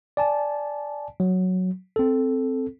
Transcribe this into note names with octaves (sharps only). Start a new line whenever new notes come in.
D5 G#5 A5
F#3
C4 A4